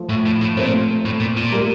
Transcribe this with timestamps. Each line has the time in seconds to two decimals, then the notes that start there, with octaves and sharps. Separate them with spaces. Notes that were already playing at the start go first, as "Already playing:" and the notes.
Already playing: F3 A3
0.09 A2
0.25 A2
0.41 A2
0.57 A#2 A3 C4
1.05 A2
1.20 A#2
1.37 A#2
1.52 G3 A#3